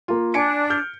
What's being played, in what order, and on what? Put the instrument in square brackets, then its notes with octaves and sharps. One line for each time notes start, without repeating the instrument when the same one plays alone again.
[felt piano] A#3 F4
[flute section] D4 [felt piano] G#5 C#7 D7
[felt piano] F6 G6